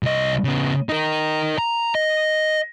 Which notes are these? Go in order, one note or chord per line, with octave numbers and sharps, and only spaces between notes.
C2 D#5
C#3 B3
D#4 A#4
A#5
D#5